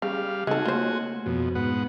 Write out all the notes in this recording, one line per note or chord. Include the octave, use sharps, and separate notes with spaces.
C#3 G3 F5
C#3 G#3 C4 D#4 F#4 A4 G#5
A3 A#3 F4 C5 C#5
F2 B2 F#4
G#2 B3 F#5